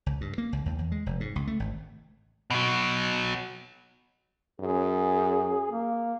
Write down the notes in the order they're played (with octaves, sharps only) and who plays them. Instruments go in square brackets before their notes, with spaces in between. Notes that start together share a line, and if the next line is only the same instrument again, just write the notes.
[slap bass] C#2
G2
A#3
C#2
D#2
E2
G#3
F1
G#2
C#2
A3
G#1
[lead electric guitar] B2 F#3
[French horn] F#2 [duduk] G#4
[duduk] A#3